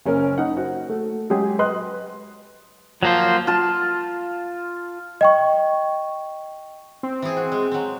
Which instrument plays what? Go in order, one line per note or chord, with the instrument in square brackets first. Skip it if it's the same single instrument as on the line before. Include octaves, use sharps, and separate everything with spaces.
[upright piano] F#1 C#4 A#4
D#4 F#5
F#4 C5
A3
F#3 G#3 G4 G#4
B4 D#5 C6 D#6 F#6
[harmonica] F3 [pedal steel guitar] F#3 A#3 C5
[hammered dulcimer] F4 A5
[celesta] D#5 G5 C#6
[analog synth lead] C4
[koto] E3 G#4
F#4
G#3
F#3 C4